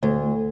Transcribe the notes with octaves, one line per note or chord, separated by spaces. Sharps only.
D2